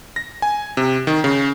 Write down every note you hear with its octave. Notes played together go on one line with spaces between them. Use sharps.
A#6
G#5
C3
D#3
C#3